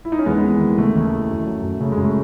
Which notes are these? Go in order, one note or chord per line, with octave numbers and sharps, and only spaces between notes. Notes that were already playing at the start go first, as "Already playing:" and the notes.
E4
D#4
C#4
D#2 G#3 B3
E3
D#2
C#3 A3
D#2
E3
F#2
F#3
F#2
C#3 A3
G#3
F#2
A3